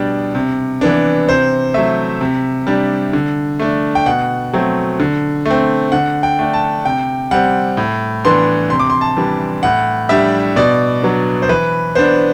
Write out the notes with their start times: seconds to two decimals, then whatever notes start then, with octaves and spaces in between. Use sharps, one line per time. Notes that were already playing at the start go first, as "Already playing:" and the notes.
Already playing: B2 G3 D4
0.35 C3
0.81 E3 B3 D4
1.28 C3 C5
1.74 F#3 A3 E5
2.21 C3
2.67 G3 D4
3.13 D3
3.59 A3 D4
3.95 G5
4.06 B2 F#5
4.53 F#3 A3 C4
5.00 D3
5.45 A3 C4
5.92 D3 F#5
6.23 G5
6.39 A3 D4
6.53 A5
6.85 C3 G5
7.31 G3 C4 F#5
7.77 A2
8.24 E3 B3 D4 C6
8.70 C3 C6
8.79 D6
8.90 C6
9.01 A5
9.17 E3 G3 D4
9.63 A2 F#5
10.09 G3 D4 E5
10.56 B2 D5
11.02 F#3 B3 D4
11.42 C5
11.49 E3 B4
11.95 B3 D4 C5